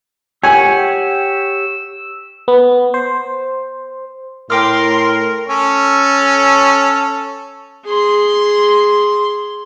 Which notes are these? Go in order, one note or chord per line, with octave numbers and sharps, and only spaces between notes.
G4 C#5 F#5 G#5 E6
B3
C5
A2 A#4 G5 C6 D6 F6
C#4 A4 C#5
G#4 C6